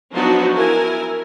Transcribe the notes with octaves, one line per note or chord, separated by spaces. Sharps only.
F3 F#3 B3 D4 D#4 F#4
E4 A#4 G#5